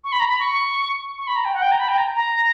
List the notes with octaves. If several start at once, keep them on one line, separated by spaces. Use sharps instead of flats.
C#6
B5
A#5
B5
C#6
C#6
B5
A#5
G5
F#5
G5
A#5
B5
G5
A#5
A#5